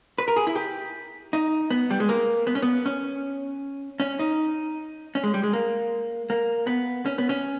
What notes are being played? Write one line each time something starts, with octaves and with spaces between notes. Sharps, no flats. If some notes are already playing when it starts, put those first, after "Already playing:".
B4
A#4
G#4
E4
G4
D#4
B3
G3
G#3
A#3
B3
C#4
B3
C#4
C#4
D#4
C#4
G#3
G3
G#3
A#3
A#3
B3
C#4
B3
C#4